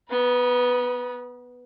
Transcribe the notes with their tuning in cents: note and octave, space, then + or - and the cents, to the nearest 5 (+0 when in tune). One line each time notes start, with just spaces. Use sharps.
B3 +0 B5 -40